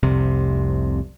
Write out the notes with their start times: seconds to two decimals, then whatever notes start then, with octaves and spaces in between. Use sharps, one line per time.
0.03 F1 C2 C3